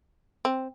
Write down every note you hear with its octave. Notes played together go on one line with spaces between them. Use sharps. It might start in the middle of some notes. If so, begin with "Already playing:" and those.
C4